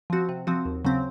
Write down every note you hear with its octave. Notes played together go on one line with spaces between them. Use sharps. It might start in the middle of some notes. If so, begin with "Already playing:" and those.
F3 C4 F#4
C3
F3 C4 F#4
D#2
C#3 F#3 C4